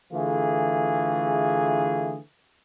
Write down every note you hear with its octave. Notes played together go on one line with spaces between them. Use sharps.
D3 E3 A3 F4 G#4